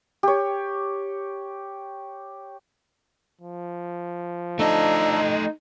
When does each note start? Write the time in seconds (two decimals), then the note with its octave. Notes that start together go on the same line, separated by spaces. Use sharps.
0.23 G4 C#5
3.42 F3
4.59 A3 D4 D#4 A4 D#5 A#5